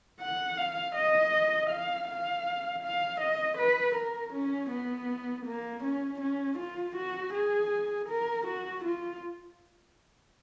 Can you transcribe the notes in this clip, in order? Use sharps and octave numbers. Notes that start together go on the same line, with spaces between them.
F#5
F5
D#5
F5
F5
F5
D#5
B4
A#4
C#4
B3
A#3
C#4
C#4
F4
F#4
G#4
A#4
F#4
F4